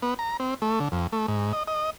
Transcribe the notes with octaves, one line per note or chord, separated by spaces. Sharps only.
B3
A#5
C4
A3
D3
F2
A3
G#2
D#5
D#5